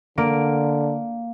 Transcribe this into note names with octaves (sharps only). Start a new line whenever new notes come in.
D3 A#3 D7